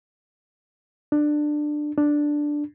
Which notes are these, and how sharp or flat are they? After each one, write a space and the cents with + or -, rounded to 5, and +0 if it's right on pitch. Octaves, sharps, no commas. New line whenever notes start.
D4 +15
D4 +0